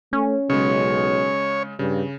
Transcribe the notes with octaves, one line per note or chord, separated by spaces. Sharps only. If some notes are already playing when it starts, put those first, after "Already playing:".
A3 C#4
B1 C#3 G#3 C#5
G2 C#3